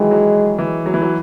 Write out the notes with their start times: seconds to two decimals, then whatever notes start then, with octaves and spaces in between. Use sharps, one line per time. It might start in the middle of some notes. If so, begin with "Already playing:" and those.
Already playing: D#3 E3 F#3 G#3
0.11 F#3
0.59 E3
0.86 F#3
0.94 E3
1.02 F#3